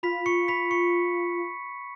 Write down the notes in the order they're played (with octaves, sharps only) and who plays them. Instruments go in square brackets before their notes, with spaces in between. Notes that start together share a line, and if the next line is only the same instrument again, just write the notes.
[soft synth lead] F4 [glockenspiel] B5 B6
[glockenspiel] C#6 C#7
B5 B6
C#6 C#7